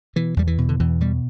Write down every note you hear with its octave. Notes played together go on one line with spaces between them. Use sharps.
B2 E3
E2 G3
E3
B2
D3
E2 E3
B2 G3